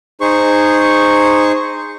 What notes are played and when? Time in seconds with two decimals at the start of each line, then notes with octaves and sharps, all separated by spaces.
0.21 D#4 G#4 C5 C#6